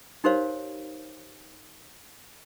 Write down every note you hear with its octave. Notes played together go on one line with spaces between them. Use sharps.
D#4 G4 A#4 C5 C#5 F5